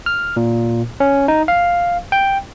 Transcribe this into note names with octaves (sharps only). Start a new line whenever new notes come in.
F6
A#2
C#4
D#4
F5
G5